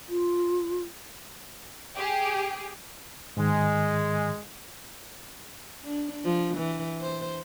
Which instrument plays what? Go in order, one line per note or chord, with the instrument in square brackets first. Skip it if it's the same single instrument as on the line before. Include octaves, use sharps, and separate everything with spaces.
[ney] F4
[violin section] G4 G#4
[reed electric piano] G#2 D#3 [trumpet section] G#3
[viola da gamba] D4
F3
E3
C5